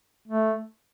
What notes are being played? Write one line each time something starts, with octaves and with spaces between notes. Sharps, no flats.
A3